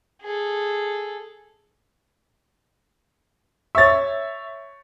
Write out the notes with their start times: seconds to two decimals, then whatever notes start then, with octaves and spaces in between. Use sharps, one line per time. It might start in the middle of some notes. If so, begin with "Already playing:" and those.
0.21 G#4 A4
3.75 C#5 E5 C#6 A6